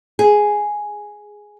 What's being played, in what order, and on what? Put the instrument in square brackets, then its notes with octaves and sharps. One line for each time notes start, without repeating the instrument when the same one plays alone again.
[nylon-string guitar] G#4